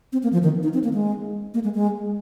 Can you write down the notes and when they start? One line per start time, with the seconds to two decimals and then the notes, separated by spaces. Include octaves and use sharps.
0.13 C4
0.23 A#3
0.33 F3
0.43 D#3
0.63 D#4
0.74 C4
0.84 A#3
0.94 G#3
1.54 A#3
1.64 G#3
1.74 G#3